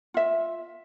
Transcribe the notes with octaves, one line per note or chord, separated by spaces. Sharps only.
F4 E5